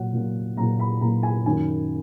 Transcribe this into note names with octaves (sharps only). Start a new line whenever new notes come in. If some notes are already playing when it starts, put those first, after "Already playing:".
Already playing: A#2 F#3 F#5
A#2 F#3
A#2 F#3 A#5
B5
A#2 F#3 A#5
G#5
F#2 D#3 F#3 G#5